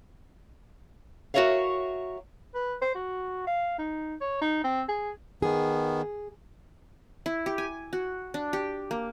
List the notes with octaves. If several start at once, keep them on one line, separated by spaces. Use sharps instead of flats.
F#4 G#4 A#4 C#5 E5 F5
B4
C5
F#4
F5
D#4
C#5
D#4
C4
G#4
D#3 B3 G#4
E4
G4
G#5
F#4
D4
G4
A#3